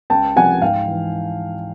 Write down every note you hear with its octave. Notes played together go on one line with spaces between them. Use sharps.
C#2 G5 A5
C3 F3 F#5 G#5
G#2 F5 G5
E3